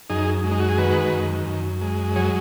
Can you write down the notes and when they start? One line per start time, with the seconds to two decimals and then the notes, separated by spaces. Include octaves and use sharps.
0.10 F#2 D#4 G#4
0.44 G#3
0.51 D#4
0.60 F#4
0.69 G#4
0.78 D#3 F#4 B4
1.12 F#2
1.47 F#2
1.82 G#3
2.16 F#3 G#4 C#5